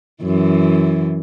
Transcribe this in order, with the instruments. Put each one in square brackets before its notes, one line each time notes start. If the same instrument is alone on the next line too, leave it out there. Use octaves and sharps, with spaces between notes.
[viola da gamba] F#2 E3